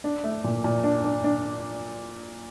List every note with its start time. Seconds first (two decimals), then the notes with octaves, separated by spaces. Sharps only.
0.04 D4
0.24 A3
0.44 A#2
0.64 A#2
0.84 D4
1.04 D4
1.24 D4